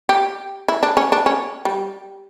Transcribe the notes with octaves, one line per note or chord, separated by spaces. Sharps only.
G4
E4
D4
C#4
D4
C#4
G3